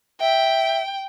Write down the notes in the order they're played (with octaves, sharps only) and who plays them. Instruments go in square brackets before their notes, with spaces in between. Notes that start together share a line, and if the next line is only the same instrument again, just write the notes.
[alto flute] E5 [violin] G5